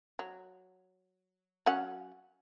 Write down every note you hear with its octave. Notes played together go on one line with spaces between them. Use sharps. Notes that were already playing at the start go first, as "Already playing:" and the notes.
F#3
F#3 C#4 F#5